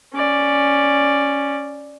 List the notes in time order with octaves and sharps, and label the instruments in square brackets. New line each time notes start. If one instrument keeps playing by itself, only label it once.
[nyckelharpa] C#4 D5